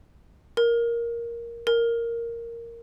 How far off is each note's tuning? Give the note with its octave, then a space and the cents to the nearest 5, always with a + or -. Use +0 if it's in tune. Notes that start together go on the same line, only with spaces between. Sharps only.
A#4 +5
A#4 -5